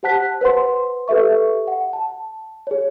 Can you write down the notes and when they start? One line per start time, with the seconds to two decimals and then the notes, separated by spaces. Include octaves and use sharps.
0.03 G4 C5 F#5 A5 F#6 B6
0.41 B4 C5 F#5 C6
1.08 G4 A4 B4 E5 C#6
1.67 F#5
1.93 A5
2.67 G#4 C#5